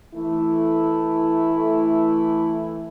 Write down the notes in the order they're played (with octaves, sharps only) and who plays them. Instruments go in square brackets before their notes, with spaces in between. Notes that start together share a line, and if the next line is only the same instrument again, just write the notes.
[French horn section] E3 A3 E4